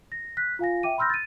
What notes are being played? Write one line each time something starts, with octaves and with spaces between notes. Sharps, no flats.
A#6
F#6 B6
F4 F5 G#5 A#6
E5 G5 D6 D#7
B5 C6 E6 F6 G6 A#6
A6 D#7